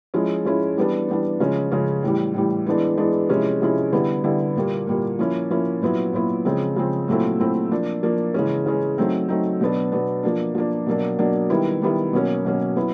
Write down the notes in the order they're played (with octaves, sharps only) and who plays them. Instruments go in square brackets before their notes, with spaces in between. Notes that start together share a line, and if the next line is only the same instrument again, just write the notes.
[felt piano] F3 G#3 C#4 E4
F3 G#3 C#4 E4
E3 G3 B3 D4
E3 G3 B3 D4
C#3 F3 G#3 C#4
C#3 F3 G#3 C#4
A2 E3 G3
A2 E3 G3
E3 G#3 B3 D4
E3 G#3 B3 D4
C3 F3 G#3 C#4 E4
C3 F3 G#3 C#4 E4
D3 G3 B3 E4
D3 G3 B3 E4
A#2 G3 A#3
A#2 G3 A#3
F3 A#3 C#4 E4
F3 A#3 C#4 E4
A#2 F#3 B3 E4
A#2 F#3 B3 E4
C#3 F3 G#3 C4
C#3 F3 G#3 C4
A#2 F#3 A3 C4 E4
A#2 F#3 A3 C4 E4
F3 A#3 D4
F3 A#3 D4
C#3 E3 G#3 C#4
C#3 E3 G#3 C#4
F#3 A3 C4 D#4
F#3 A3 C4 D#4
B2 F#3 B3 D4
B2 F#3 B3 D4
F3 A#3 D4
F3 A#3 D4
B2 F#3 A#3 D4
B2 F#3 A#3 D4
D#3 G3 B3 E4
D#3 G3 B3 E4
B2 F#3 A#3 C#4
B2 F#3 A#3 C#4
F#3 B3 E4